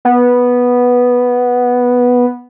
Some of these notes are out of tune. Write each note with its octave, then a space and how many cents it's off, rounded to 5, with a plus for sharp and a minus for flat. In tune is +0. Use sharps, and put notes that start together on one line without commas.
B3 -5